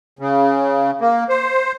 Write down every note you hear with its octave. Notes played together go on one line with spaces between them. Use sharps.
C#3
A#3
C5